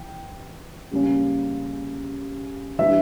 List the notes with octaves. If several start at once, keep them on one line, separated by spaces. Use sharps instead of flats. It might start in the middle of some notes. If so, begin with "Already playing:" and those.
Already playing: E3 G5
C#3 G3 A#3 C#4
E3 G3 D4 E5